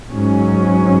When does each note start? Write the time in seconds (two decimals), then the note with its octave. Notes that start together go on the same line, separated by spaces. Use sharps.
0.11 G#2 F#3 C#4